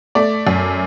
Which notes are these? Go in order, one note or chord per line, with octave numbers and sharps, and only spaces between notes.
A3 D5
F#2